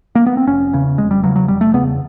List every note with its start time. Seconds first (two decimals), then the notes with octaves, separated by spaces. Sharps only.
0.15 A#3
0.26 B3
0.37 C4
0.47 F1 C#4
0.73 E2 C#3
0.98 F1 G#3
1.11 G3
1.23 E2 C#3 F#3
1.36 F#3
1.48 F1 G3
1.61 A3
1.73 E2 C#3 B3